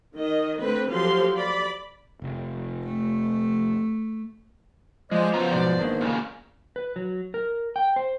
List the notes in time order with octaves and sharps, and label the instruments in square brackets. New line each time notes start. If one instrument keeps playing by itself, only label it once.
[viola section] D#3 D#5
D3 A3 C4 B4
F3 F#3 G4 A4 F5 C6
D5 B5
[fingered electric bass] F1
[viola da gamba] A3
[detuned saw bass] F3 [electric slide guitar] G#3 [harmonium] C5 D5 D#5
[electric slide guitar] C#3 F#3 A#5 [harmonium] B3 C5 [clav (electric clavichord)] F4
[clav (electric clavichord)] B1 G#2 F#4 [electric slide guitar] D5
[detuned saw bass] G#1 [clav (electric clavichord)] D#3 A#3 D4
[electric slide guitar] A#2 C#3
B4
F#3
A#4
G5
C5